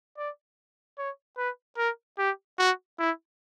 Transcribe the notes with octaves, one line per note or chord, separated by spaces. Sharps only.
D5
C#5
B4
A#4
G4
F#4
E4